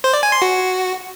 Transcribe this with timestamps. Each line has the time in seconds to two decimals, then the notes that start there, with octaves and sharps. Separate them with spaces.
0.04 C5
0.13 D5
0.23 G#5
0.32 C6
0.42 F#4